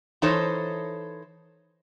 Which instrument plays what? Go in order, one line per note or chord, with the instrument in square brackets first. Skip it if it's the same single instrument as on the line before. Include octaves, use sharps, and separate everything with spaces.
[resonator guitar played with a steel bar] E3 D#4 A4 C5 C#5